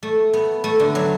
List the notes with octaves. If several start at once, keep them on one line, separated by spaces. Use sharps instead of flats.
A3
B3
A3
D3
F#3